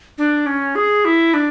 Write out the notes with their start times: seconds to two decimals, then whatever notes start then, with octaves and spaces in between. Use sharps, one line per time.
0.18 D4
0.46 C#4
0.75 G#4
1.05 E4
1.34 D4